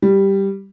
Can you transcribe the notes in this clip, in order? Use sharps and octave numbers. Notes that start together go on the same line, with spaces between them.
G3